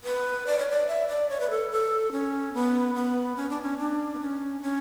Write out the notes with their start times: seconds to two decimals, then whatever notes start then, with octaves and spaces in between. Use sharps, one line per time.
0.04 B4
0.47 D5
0.59 C#5
0.70 D5
0.87 E5
1.08 D5
1.29 C#5
1.40 B4
1.50 A4
1.71 A4
2.12 C#4
2.54 B3
2.95 B3
3.36 C#4
3.50 D4
3.62 C#4
3.78 D4
4.15 B3
4.20 C#4
4.62 C#4